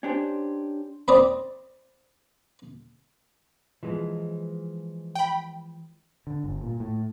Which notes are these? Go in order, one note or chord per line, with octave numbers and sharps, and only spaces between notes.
C#4 D4 G4 C5
C4 D5 D#5 B5
E3 F3 G#3
G5 B5
D3
G1
A#2
A2